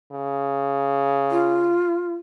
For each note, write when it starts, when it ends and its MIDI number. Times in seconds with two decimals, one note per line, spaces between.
0.12 1.79 49
1.30 2.13 65